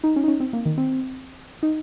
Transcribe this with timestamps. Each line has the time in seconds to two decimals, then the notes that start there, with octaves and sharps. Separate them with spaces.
0.04 D#4
0.16 C#4
0.24 D#4
0.28 C#4
0.40 C4
0.53 A#3
0.66 D#3
0.78 C4
1.63 D#4